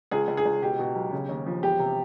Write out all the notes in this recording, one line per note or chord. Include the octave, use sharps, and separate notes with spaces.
C#2 G#4
C#2
G#4
C#2
B2 G4
B2
B1
C#3
D#2
F3
E1 G4
C3